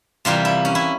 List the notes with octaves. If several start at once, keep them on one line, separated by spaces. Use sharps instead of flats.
C3 E3 G3 A#3 F4
E4
C#4
E4